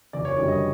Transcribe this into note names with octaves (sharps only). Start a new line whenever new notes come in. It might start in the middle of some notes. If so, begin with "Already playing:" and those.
F#1 D5
C#5
F#2 D3 G3 D5
D#5